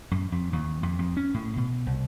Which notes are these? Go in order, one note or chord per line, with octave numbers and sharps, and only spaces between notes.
F#2
F2
D#2
F2
F2
C#4
A2
B2
C2